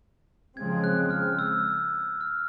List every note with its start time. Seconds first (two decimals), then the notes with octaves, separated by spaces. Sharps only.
0.56 C#3 F3 G#3 C4 G#6
0.84 F#6
1.11 F6
1.32 F6
1.39 E6
2.21 F6